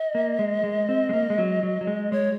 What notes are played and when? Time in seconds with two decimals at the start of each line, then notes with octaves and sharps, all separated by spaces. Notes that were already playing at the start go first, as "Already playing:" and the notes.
Already playing: D#5
0.15 A#3
0.39 G#3
0.64 G#3
0.89 C4
1.09 G#3
1.13 A#3
1.30 G#3
1.38 F#3
1.63 F#3
1.81 F#3
1.87 G#3
2.12 G#3 C#5